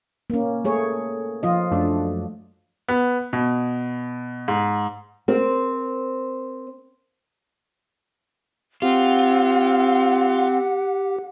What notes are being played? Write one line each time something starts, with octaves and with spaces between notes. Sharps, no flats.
A#3 C#4
A3 G#4 C#5
F3 F4 D#5
F#2 A3 D4
B3
B2
G#2
C4 A#4 C5
C4 F4 G4 F#5